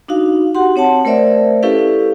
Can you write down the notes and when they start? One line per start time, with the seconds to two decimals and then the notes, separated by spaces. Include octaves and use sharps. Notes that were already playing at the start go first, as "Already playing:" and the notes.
0.08 D4 D#4 F#4 F5
0.55 F#4 G4 F#5 C6
0.76 C4 C#5 F#5 A5
1.05 A3 A#4 C5 D5 E5
1.63 C#4 E4 G4 A4 B4 F5